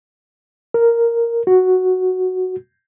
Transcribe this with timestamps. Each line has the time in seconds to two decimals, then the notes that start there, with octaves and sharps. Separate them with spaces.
0.74 A#4
1.47 F#4